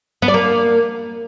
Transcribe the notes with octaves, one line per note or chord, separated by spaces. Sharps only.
B3
D5
A#3